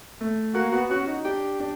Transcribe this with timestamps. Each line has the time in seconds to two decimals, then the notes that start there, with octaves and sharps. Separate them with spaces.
0.21 A3
0.55 A#3 F#4
0.72 B3 F#4
0.90 C#4 F#4
1.07 D#4 F#4
1.25 D4 G4
1.60 D4